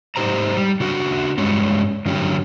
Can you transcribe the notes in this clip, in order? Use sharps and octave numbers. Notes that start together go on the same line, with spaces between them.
G#2 D#4 G4 C5 A#5
G3
C#3 D4 F#4 F#5
G2 G3 G#3 C#4
G2 D3 F#3 C#4 G4